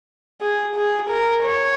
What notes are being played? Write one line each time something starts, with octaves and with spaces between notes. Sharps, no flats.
G#4
G#4
A#4
C#5